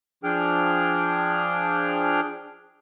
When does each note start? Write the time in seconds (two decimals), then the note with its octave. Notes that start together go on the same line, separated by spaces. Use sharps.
0.24 F3 D4 G#4 G5 F6